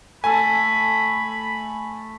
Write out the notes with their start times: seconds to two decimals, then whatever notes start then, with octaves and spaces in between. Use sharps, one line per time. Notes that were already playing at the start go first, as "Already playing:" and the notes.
0.24 A3 A4 G#5 B5